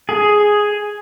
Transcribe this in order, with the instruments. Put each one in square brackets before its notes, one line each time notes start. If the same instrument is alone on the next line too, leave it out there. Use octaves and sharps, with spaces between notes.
[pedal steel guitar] G#4